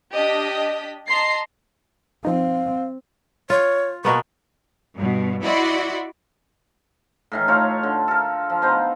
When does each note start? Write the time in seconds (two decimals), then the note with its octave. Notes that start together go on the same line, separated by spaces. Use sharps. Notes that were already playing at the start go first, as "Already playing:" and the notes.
0.12 D4 G4 D#5 D#6 B6
1.09 D#5 A5 A#5 C6 C7
2.25 F3 C4 D#4 F5
3.50 F4 C#5
4.05 B2 A#3 B3 C#6
4.96 G2 B2
5.43 E4 F#4 D5 D#5 B5 C6
7.32 A2 D#3 E3
7.48 D#4 F4 A4 C#5
7.83 D3
8.08 A4 A#4
8.50 F3
8.62 B3 D#4 C5